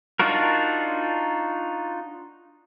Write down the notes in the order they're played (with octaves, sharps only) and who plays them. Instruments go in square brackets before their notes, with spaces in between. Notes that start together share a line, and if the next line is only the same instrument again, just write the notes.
[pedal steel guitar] D4 D#4 F4 F#4 A#4